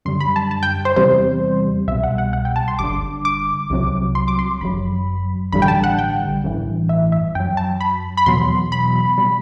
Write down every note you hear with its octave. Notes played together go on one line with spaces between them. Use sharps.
F#2 D3 G3 C6
B5
A5
A5
G5
C5
E2 C3 G3 C5
C2 B2 G3 E5
F#5
F#5
F#5
G5
A5
C6
G1 G2 D3 D6
D6
C2 C3 F#3
C6
D6
C6
G1 F#2 F#3 B5
A1 G2 D3 G3 B5
G5
A5
F#5
G5
A1 G2 E3
E5
E5
F#2 F#3 G5
A5
B5
B5
E2 B2 F#3 C6
B5
B2 G3